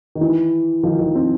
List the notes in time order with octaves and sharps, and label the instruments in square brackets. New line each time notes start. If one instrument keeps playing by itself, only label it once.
[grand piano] D#3
E3
D#3 F3
D#3 F3
C4